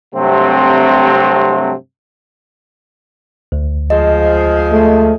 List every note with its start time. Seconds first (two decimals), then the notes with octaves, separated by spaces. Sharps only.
0.15 G2 C3 F#3 A3 C4
3.52 D2
3.90 F3 G#3 D#5
4.72 A3